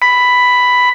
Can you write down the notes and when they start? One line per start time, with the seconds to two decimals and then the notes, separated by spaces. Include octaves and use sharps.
0.02 B5